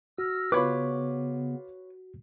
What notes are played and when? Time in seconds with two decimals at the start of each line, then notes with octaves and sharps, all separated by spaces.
0.18 F#4 E6 F6 A#6
0.52 C#3 B3 F4 B4 C#5 B5 D6